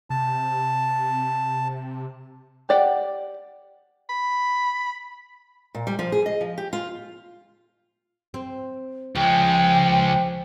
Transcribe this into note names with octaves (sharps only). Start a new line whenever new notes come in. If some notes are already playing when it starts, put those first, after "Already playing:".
C3 A5
G4 D5 F#5 G5
B5
A#2
G3
F3
G#4
D#5
F3
G4
F4
C4
C#2 F3 G#3 G5